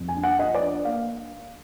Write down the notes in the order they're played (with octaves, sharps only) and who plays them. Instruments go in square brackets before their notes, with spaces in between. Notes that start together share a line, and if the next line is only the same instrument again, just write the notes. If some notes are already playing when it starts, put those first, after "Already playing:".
Already playing: [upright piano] F2
G#5
D4
F#5
F3 D#5
D5
D4
A#3 F5